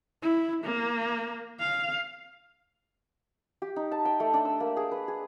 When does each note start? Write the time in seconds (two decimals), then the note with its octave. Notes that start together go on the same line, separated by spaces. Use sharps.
0.22 E4
0.65 A#3
1.60 F5
3.62 G4
3.76 D#4
3.91 A5
4.05 G5
4.20 A3
4.34 D4
4.45 E6
4.60 A#3
4.77 G#4
4.91 B4
5.08 G#4